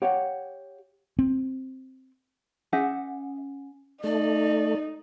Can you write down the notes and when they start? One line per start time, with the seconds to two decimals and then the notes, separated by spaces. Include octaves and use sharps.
0.02 G4 C#5 F5 F#5
1.19 C4
2.73 C#4 G#4 E5 F#5 G#5
4.04 A3 D#4 D5